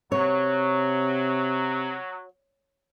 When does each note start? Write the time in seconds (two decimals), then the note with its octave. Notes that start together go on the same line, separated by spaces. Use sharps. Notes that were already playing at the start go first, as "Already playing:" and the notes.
0.12 C3 F#3 C#5